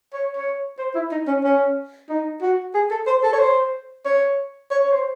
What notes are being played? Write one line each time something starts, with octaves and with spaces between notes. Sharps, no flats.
C#5
C#5
C5
E4
D#4
C#4
C#4
D#4
F#4
G#4
A4
C5
A4
C#5
C5
C#5
C#5
C#5
C5